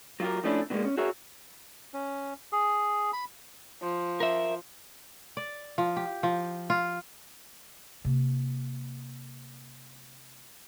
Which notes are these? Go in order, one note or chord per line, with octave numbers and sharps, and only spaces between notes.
F#3 F4 G4 A#4
F3 A3 C#4 D4 E4
B2 E3 G3 G#3 A#3
C#4
F#4 G#4 A#4 C#5 E5
C#4
G#4
B5
F3
A#4 E5
D5
F3
G4
F3
F4
C3 A#3